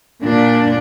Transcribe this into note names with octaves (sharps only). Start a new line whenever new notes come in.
A#2 D4